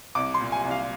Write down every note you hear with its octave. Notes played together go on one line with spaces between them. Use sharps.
C2 D6
C6
A#2
G#5
C2
F5